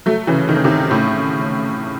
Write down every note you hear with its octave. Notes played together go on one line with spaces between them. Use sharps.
F#3 A3
C#3 E3
D#3
C#3
C3 D#3
A2 C#3